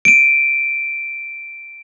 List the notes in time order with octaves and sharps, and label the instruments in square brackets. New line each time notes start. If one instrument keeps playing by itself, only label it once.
[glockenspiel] D7 D#7